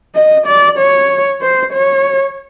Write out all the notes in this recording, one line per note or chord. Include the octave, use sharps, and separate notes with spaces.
D#5
D5
C#5
C5
C#5